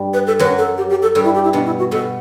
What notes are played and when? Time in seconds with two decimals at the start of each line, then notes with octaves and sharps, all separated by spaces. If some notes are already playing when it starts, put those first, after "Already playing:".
Already playing: G2 G3
0.14 B4
0.27 A4
0.39 F#2 F#3 B4
0.58 A4
0.78 G4
0.90 G4
1.02 A4
1.15 G2 G3 A4
1.25 E4
1.35 G4
1.44 E4
1.53 B2 B3 D4
1.66 E4
1.79 F#4
1.91 B2 B3 A4